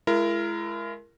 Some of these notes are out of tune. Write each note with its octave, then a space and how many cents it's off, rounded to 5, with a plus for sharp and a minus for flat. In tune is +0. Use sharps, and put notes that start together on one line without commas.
G#3 +30 E4 +40 A#4 +0